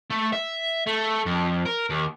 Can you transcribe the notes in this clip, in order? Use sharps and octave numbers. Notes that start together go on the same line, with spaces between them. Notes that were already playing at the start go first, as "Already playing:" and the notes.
A3
E5
A3
F2
A#4
D#2